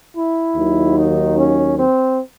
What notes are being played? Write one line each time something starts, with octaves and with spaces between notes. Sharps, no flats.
E4
D#2 D#3 F#3
D#4
C#4
C4